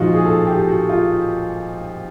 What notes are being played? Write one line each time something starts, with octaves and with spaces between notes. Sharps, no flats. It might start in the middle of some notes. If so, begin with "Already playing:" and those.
Already playing: A#2 F3 G#3 D#4 F4 F#4
G#4
A4
G4
F#4
F4